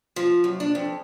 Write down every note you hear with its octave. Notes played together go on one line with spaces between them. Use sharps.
F3
F#2
D4
F2